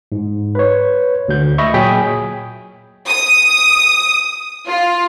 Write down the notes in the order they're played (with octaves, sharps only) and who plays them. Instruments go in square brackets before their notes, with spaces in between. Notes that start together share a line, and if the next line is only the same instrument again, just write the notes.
[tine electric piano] G#2
B4 C#5
D2 G6
D#5 E5 B5 C#6
A#2 F#3 G#4 G5 G#5 B6
[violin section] D#6
F4